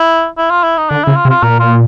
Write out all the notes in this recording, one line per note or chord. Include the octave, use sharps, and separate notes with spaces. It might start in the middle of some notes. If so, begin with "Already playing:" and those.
Already playing: E4
E4
F4
E4
D#4
D3 D4
C#3 E4
F4
C3
F4
A#2 A#4
F4